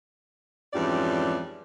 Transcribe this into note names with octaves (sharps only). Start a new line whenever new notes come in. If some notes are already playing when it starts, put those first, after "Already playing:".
F2 G#2 E3 G3 C#4 D5